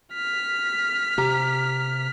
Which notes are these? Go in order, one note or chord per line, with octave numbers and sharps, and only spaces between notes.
F6 B6
C3 G4 A#5